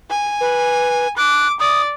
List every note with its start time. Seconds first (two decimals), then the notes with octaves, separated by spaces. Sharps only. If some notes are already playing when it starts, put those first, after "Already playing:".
0.10 G#5
0.41 B4
1.17 D6 F#6
1.60 D5 D#6